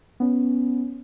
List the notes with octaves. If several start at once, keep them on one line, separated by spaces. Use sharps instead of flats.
B3 C#4